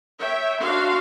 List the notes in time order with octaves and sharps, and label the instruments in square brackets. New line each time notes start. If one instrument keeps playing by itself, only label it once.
[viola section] C#5 E5 G5
D4 F#4 F5 C6